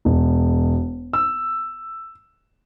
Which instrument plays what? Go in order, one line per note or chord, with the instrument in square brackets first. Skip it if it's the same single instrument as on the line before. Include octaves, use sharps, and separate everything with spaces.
[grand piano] E1
E6